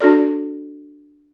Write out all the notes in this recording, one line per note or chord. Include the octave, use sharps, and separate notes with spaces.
D4 F#4 A4 D5